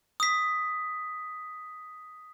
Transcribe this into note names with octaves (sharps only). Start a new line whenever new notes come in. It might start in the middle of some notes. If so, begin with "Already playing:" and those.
D#6 B6